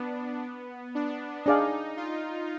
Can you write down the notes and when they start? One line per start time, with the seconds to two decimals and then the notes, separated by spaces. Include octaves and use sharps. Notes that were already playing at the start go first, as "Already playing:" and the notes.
Already playing: B3 D4
0.95 D4
1.45 D4 D#4 G#4 D5 F5
1.97 F4